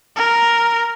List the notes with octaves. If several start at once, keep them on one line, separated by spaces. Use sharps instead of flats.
A#4